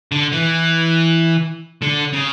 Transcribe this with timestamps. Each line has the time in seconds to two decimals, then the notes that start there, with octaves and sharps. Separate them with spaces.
0.12 D3
0.33 E3
1.82 D3
2.13 C#3